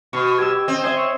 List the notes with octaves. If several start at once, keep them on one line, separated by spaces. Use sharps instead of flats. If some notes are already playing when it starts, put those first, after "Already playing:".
B2 C#6
G4 E6 G#6
C4 D#5
C5 D#5 E5 G#5
C#5